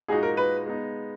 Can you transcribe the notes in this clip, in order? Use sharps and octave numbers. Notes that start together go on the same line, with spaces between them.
A#2 G#3 D#4 F#4 G#4
A#4
B4
G#3 B3 D#4